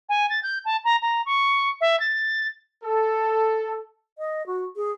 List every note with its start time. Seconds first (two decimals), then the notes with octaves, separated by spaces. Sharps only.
0.09 G#5
0.30 A6
0.43 G6
0.65 A5
0.84 A#5
1.02 A#5
1.26 C#6
1.81 E5
2.00 A6
2.84 A4
4.18 D#5
4.46 F#4
4.76 G#4